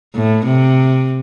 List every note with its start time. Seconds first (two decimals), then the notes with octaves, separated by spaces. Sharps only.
0.15 A2
0.46 C3